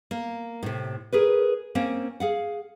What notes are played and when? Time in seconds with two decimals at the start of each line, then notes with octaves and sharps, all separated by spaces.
0.11 A#3
0.63 A2 C3
1.13 G#4 A#4 B4
1.75 A#3 C4 C#4
2.20 G#4 F5 F#5